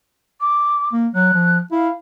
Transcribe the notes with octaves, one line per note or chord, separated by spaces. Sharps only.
D6
A#3
F#3 F#6
F3
E4 F5